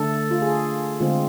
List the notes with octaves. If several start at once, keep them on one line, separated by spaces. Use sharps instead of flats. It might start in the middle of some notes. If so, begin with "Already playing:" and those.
Already playing: D3 A3 D4 A4
F4
G#4
D3 G#3 C4 F4